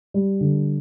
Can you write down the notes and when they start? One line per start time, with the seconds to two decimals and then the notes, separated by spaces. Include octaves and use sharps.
0.14 G3
0.41 D3